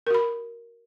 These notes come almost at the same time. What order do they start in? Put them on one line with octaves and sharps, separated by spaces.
A#4 F#4 B5